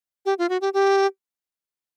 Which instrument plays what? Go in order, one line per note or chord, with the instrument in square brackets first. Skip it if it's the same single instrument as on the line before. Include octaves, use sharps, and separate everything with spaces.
[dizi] G4
F4
F#4
G4
G4